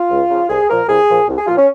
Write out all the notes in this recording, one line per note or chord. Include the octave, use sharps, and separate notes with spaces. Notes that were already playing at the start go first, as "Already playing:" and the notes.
Already playing: F4
C#2
C#3 F3
C2 G#4
A#2 F3 A#4
C2 G#4
A#2 F3
C2
G#4
A#2 F3 F4
C#4